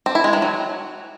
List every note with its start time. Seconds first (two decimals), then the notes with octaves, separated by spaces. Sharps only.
0.06 C4
0.15 E4
0.24 G#3
0.33 D#3
0.42 F#3